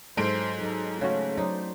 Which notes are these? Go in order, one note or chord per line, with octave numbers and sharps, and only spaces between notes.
G#2 F#3 A4 C5 D7
F#3 D#4 A4
C#3 A3 F#4
F#3 D#4 C5 D5